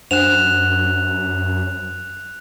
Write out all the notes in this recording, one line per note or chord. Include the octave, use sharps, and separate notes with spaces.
F#2 D4 C5 F#5 F#6 E7 F7